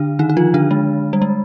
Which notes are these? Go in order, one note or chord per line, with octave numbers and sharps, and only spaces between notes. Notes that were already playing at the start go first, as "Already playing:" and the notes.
Already playing: D3 D4
D#3 D#4
D#4
F3 F4
D3 D4
G#3
G3
G#3